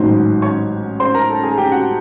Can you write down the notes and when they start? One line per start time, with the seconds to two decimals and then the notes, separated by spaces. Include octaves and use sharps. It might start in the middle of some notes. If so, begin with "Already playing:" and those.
Already playing: A1 G#2 D#3 F#3 C5 C6
0.42 C#5 C#6
1.00 C5 C6
1.15 A#4 A#5
1.29 A4 A5
1.43 G#4 G#5
1.58 G4 G5
1.72 F#4 F#5